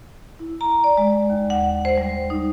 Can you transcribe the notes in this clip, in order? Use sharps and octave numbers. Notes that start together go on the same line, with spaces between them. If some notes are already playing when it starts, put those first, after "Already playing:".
E4
A#5
D5
G#3
D#2
F#5
C5
G3
D#4